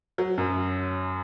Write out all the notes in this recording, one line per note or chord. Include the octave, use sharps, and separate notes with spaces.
F#3
F#2